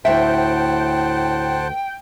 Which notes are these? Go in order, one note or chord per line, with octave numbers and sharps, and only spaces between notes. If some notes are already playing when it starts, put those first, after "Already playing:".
D2 A2 C5 E5 F#5 G5 A5